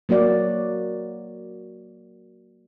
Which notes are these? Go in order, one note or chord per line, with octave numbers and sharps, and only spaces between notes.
F#3 A#3 F#4 D5